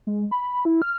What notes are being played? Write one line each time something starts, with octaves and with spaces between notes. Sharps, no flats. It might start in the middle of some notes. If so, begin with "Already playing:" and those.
G#3
B5
E4
F6